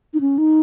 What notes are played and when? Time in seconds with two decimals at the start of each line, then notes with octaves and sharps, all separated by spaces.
0.14 D#4
0.21 C#4
0.38 D#4